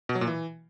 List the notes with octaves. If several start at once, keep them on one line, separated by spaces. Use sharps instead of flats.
B2
F#3
A#2
E3